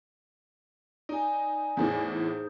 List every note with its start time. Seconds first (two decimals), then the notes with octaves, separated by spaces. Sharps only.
1.09 D#4 D5 G#5
1.77 E2 A2 E3 D#4 G#4 C5